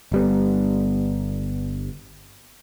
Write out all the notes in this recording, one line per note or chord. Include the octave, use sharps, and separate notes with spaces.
G1 G3 B3